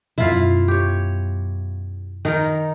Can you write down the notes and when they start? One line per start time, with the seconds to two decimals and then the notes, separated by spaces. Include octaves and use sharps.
0.18 F#2 B2 E4 F4 F5
0.68 G4 C#5
2.25 D#3 D#4 A#4